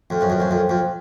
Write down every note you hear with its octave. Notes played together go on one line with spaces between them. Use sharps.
F2
F#2
F2
F#2
F2
F2